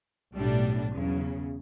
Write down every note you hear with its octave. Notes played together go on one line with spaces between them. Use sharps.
B1 A2 G3 D4
E2 C#3 F#3